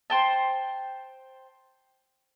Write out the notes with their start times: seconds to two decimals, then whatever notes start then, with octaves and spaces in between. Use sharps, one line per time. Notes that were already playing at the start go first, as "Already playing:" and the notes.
0.10 C5 G5 A5